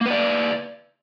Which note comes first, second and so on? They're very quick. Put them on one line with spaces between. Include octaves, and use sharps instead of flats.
A#3 B4 D5